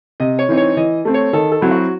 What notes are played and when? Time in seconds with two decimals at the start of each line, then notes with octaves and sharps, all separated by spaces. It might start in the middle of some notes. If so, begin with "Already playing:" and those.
0.20 C3 D#5
0.39 C#5
0.48 E3 C4 D#4
0.57 C#5
0.77 E3 D#5
1.05 A3 C4
1.14 C#5
1.33 D#3 A4
1.52 A4
1.61 F#3 C4 E4
1.71 F#4